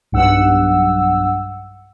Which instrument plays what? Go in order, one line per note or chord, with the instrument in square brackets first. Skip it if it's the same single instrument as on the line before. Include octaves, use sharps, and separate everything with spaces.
[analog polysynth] B1 G2 F#5 E6